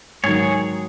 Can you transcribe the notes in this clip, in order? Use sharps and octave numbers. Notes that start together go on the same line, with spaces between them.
G#2 D#3 F#3 G#4 C#5